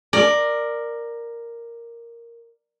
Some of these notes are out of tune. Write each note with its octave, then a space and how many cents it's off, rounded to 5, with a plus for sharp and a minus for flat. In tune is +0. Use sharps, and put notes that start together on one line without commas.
A#4 +0 D5 +15